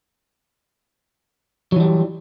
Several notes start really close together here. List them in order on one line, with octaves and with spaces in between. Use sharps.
F#3 E3 G3